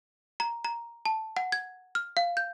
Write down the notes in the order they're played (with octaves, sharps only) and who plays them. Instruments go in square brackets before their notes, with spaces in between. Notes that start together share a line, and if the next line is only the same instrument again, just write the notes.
[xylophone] A#5
A#5
A5
F#5
G#6
F6
F5
G6